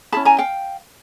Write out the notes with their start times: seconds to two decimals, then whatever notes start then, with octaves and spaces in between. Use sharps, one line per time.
0.12 C#4 E4 G#4 A5 B5
0.25 G#5 A#5
0.38 F5 G5